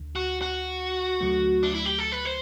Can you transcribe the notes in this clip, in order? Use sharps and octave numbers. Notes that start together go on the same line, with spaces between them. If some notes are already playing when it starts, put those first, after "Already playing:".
Already playing: D2 D3
F#4
F#4
D2 D3 F#3 A3
D4
E4
G4
A4
B4
C5